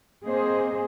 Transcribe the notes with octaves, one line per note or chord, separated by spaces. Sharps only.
A#3 C4 G#4 C5 D#5